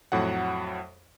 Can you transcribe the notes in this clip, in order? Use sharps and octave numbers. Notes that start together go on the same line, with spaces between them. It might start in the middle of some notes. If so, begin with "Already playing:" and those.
F2 A2 F#3 F#5